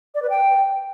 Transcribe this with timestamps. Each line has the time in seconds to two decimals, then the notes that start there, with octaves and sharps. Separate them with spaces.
0.15 D5
0.22 B4
0.30 G5